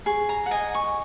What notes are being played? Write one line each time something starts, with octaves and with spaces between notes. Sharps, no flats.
G#4 C#6
A#5
F#5
D#5 G#5
C#6